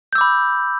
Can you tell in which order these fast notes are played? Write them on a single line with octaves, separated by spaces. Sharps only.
G6 E6 D6 B5